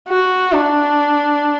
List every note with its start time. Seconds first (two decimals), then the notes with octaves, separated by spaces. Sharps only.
0.09 F#4
0.53 D4